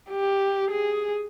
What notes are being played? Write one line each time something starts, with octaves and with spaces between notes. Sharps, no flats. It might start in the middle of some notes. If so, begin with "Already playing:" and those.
G4
G#4